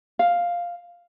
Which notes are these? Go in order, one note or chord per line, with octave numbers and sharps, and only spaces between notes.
F5